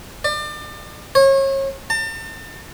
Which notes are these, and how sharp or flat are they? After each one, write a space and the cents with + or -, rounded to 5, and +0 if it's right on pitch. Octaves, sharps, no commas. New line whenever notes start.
D5 +35
C#5 -35
A5 +40